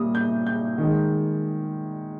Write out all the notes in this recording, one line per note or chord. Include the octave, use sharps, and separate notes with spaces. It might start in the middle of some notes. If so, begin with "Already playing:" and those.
Already playing: A#2 G3 A#3 D#6
G6
G6
D#3 G#3